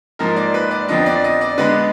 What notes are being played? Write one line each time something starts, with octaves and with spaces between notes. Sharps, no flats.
G#2 F3 A#3 A#4
D5
B4
D5
F2 D3 F3 B3 D#5
D5
D#5
D5
D3 G#3 B3 B4